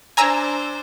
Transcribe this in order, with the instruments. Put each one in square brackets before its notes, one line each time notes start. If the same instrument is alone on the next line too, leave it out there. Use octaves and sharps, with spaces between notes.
[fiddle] D4 C5 [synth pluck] G#5 A#5 E6